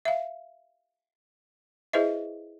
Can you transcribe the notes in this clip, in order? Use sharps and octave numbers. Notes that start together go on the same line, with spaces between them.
E5 F5
E4 G#4 B4 C5 D#5 E5